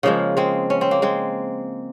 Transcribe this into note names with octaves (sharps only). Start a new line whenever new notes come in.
C#3 F3 G#3 A#3
G#3 C4
C#4
C4
A#3
G#3 C4